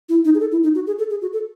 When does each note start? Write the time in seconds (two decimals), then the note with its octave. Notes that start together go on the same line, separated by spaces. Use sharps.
0.09 E4
0.25 D#4
0.34 G#4
0.40 A4
0.52 E4
0.63 D#4
0.75 F#4
0.87 G#4
0.99 A4
1.10 G#4
1.21 F#4
1.33 A4